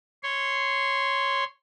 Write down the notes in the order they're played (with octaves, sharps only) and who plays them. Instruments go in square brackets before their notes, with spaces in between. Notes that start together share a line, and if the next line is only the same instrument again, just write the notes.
[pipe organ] C#5 C6